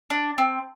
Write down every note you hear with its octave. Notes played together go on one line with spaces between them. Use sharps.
D4
C4